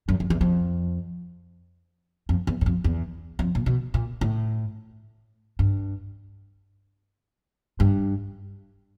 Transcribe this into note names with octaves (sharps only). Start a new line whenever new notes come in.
F#2
F2
E2
F2
F2
E2
F#2
F2
E2
F2
A#2
B2
A#2
A2
G2
G2